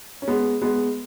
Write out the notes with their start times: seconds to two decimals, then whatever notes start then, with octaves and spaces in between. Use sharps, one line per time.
0.22 C#4
0.28 G#3 B3
0.62 G#3 B3